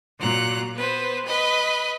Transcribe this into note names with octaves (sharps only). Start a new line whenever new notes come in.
A#2 F#3 A#5 F#6
B3 B4 C5
B4 D#5 B5